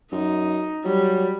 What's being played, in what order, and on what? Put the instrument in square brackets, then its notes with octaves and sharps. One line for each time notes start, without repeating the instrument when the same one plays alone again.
[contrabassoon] F#2 [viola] D#4
[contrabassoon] F#3 [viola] G3